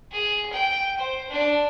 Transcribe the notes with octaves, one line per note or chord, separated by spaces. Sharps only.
G#4
G5
C5
D4